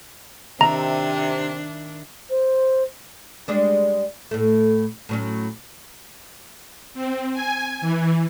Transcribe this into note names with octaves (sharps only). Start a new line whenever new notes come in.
C3 D#3 D4 E5 A#5
C5
G3 G#3 D4
A2 A3
A2 F#3 C#4
C4
G#5
E3